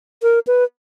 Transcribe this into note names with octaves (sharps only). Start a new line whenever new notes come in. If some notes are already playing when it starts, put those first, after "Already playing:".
A#4
B4